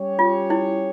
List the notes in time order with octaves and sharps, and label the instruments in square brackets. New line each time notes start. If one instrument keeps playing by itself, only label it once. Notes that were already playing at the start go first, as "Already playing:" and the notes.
Already playing: [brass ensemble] G3 C#4 G4 C#5
[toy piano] F4
E4